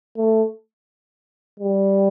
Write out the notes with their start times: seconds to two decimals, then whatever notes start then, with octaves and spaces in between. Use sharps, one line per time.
0.17 A3
1.60 G3